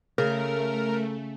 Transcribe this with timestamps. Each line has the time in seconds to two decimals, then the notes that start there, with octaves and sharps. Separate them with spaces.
0.18 C#3 A3 A#4